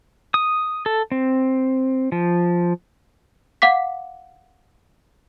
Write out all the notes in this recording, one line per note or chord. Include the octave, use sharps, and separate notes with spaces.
D#6
A4
C4
F3
F5 F#5 D6 B6